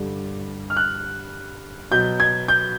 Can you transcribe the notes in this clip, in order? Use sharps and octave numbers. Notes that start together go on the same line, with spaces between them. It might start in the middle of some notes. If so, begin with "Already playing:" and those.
Already playing: G2 D3 G3
F6
F#6
B2 F#3 G6
G#6
G6